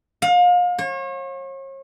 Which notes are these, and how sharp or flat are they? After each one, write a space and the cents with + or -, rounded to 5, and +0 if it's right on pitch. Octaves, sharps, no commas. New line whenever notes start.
F5 +35
C#5 -40